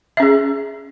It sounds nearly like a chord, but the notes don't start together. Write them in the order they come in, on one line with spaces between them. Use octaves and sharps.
E5 C#4 G#4